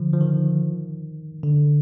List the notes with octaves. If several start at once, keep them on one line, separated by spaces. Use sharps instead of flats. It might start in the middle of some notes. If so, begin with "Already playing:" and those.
Already playing: D3 F3
F3
D#3
D3